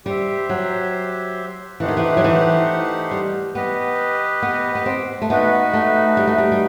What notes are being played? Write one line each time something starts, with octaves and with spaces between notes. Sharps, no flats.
G3 G4 C5 E5
F#3
E3 A3 D#4 G4 C5 F#5
D#3
E3
F#3
E3
G3
B3 G4 B4 D#5
B3
B3
C4
A3
B3 D#4 F#4 B4
A3
G3
A3
G3
G3